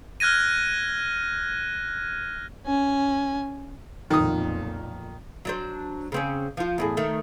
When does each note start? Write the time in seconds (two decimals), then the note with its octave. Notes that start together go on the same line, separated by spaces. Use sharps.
0.20 F6 F#6 G#6 A#6 D#7
2.67 C#4 G#5
4.10 B1 F2 A#2 D#3 D#6
5.45 F#3 D4 C5
6.12 C#3 C4 C#4
6.57 F3 F4
6.78 E2 A2 G#4
6.97 D#3 A3